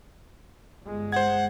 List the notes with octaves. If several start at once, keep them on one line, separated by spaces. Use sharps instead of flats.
G1 G#3
C5 F#5 G#6